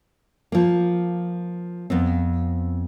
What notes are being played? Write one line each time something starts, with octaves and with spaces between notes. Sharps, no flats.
F3 A#3
F2 B3 C4